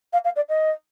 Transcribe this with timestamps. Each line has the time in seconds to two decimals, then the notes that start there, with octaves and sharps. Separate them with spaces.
0.13 F5
0.24 F5
0.36 D5
0.49 D#5